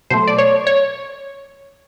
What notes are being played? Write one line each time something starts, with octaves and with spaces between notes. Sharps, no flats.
B2 F#3 A3 C5
D5
C#5
C#5